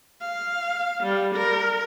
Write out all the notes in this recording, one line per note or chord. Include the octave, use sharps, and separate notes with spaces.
F5
G3
A#4